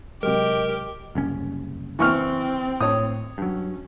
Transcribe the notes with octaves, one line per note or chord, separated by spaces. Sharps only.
C3 F#3 G#3 G4 A#4 D#5
F#1 C2 C#4
E3 C4 C#6 F6
A2 C#5 D#6
G2 F#3 C#4